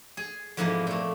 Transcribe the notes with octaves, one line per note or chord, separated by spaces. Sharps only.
G#4
F2 G#2 B2 E3 F3 A#3
A#2 A3